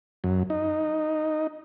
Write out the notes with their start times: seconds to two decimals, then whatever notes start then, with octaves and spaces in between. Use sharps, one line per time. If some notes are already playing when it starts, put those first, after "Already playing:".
0.24 F#2
0.50 D#4